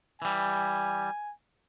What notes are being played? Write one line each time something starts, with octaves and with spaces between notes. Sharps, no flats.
E3 G3 G#5